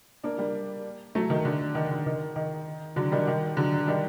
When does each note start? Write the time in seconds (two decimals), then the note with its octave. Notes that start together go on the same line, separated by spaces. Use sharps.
0.24 A#3 D4
0.38 G3 A#3
1.15 F#3 A3
1.30 D#3
1.45 D3
1.75 D#3
1.90 D3
2.06 D#3
2.36 D#3
2.96 D3 F#3
3.12 D#3 G3
3.27 D#3
3.57 D3 F#3
3.87 D#3 G3